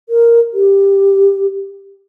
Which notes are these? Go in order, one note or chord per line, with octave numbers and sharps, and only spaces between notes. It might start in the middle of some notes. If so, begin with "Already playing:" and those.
A#4
G4